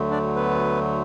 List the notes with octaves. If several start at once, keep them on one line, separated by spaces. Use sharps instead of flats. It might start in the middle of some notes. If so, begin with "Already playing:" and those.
Already playing: D2 D3 F#3 A3
D4 D5
B3 B4